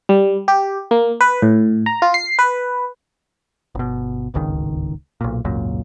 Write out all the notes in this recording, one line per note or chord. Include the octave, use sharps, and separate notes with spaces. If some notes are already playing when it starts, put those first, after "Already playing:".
G3
G4
A#3
B4
A2
A#5
F4
C7
B4
G1 B2
D1 G#1 C#2 D#3
B1 A#2
G#1 C#2 F#2 A#2